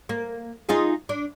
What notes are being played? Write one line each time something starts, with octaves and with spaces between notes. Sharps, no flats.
A#3
D#4 F4 G#4
D4